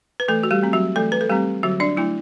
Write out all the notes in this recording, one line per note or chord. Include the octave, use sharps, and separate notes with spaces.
B4
E3 A3 A4
F#4
G3 G4
A3 C4
F#3 F#4
E3 A3 A4
B4
A4
G3 A3 C4 G4
D3 F#3 F#4
D4 D5
F#3 A3 D4 E4